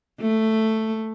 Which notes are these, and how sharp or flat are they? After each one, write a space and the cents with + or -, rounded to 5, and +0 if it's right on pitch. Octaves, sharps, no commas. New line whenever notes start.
A3 +5